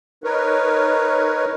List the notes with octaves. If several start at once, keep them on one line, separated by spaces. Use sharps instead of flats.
D#4 A#4 B4 C#5